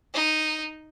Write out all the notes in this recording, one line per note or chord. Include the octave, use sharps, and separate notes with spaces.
D#4